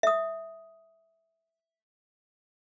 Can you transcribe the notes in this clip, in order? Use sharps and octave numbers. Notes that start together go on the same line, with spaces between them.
E5 D#6